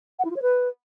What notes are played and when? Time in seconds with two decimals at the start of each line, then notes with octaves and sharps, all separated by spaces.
0.19 F#5
0.25 E4
0.30 F4
0.36 C#5
0.42 B4